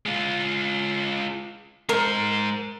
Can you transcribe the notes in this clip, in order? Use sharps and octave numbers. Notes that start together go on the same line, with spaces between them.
G#3 F4
G#3 A#4 C5